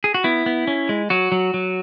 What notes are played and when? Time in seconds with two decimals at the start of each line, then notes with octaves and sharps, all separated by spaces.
0.04 G#4
0.14 F#4
0.24 B3 E4
0.46 B3
0.67 C#4
0.89 G#3
1.10 F#3 F#4
1.32 F#3
1.54 F#3